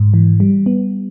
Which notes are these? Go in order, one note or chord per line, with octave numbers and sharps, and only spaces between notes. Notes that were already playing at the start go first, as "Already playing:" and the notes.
Already playing: G#2
E3
G3
B3